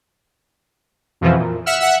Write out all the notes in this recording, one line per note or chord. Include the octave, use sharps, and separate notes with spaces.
F2 B2 E3 F3
A#2
E5 F#5 E6 F6
E5 F#5